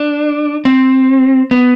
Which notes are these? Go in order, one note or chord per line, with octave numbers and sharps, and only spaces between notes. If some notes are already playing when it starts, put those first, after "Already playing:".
Already playing: D4
C4
B3